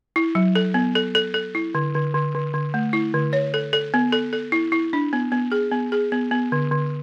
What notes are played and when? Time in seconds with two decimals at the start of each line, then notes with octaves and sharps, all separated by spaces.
0.16 E4
0.35 F#3
0.55 A4
0.74 B3
0.95 A4
1.15 A4
1.34 A4
1.55 E4
1.75 D3
1.95 D3
2.14 D3
2.35 D3
2.54 D3
2.74 A3
2.93 E4
3.14 D3
3.33 C#5
3.54 A4
3.73 A4
3.94 B3
4.13 A4
4.33 A4
4.52 E4
4.72 E4
4.93 D4
5.13 B3
5.32 B3
5.52 G#4
5.72 B3
5.92 G#4
6.12 B3
6.31 B3
6.52 D3
6.71 D3